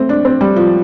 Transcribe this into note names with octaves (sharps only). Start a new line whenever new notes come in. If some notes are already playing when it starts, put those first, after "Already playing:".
Already playing: A3 C4
D4
C4
G3
F3